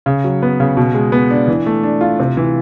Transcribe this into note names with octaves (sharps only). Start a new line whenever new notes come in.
C#3
F#3
B3
C#3
B2
G#3
B3
D4
E3
A3
D4
F4
C3
E3